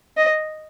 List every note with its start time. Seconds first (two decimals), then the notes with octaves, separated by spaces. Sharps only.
0.17 D#5